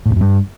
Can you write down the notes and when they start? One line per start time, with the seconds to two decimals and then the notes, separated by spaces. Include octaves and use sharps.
0.06 A2
0.11 E2
0.16 F#2
0.21 G2